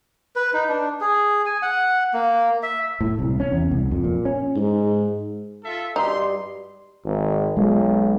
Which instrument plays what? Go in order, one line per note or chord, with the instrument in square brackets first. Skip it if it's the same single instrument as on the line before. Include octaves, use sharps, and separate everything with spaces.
[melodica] B4
D#4
D4
G#4
G#5
F#5
A#3
E5
[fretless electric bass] A2
C2
C#4
E2
C2
F2
A#2
C#4
[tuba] G#2
[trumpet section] F4 A4 E5
[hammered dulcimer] G2 G3 [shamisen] D#4 [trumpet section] C6
[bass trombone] G#1
[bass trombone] B1 [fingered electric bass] G#3